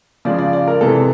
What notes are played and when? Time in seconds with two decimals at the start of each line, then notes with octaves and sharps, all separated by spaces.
0.25 C#3 F3 G#3 D5
0.39 D5
0.53 D5
0.68 A#4
0.81 C3 E3 G#3 A4